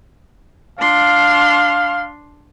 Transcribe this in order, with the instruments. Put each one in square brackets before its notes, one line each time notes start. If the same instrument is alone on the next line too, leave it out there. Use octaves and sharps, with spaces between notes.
[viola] D4 C6 [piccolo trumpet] F5